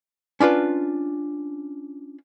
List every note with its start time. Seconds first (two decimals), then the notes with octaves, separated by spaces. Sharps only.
0.40 C#4 D4 F4 B4